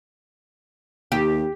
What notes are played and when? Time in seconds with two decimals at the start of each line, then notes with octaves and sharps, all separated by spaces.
1.12 D#2 G4